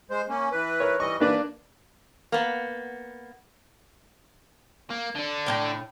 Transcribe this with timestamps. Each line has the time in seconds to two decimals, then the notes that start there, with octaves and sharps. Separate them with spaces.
0.11 G#3 C5
0.29 A#3 C#4
0.52 E3 B4
0.80 A#4 C#5
1.00 E3 G3 D#5 C#6
1.20 E3 A#3 D4 B4 D5
2.32 A#3 B3
4.90 A#3
5.15 D3 D4
5.46 A2 B3 G5